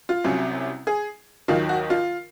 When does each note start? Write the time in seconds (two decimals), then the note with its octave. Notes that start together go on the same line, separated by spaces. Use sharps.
0.09 F4
0.24 C2 C3 F#3 C#4
0.87 G#4
1.48 D#2 D#3 F#3 F4
1.69 F#4
1.90 F4